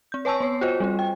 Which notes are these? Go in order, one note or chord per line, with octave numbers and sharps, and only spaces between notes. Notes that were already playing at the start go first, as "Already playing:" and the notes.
C4 G6
B4 C#5 G#5 A5 C#6 E6
B3 C#5 C7
F4 F#4 C5 D#5
G3 C4 F4
G5